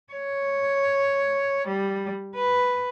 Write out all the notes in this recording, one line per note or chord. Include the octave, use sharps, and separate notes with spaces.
C#5
G3
B4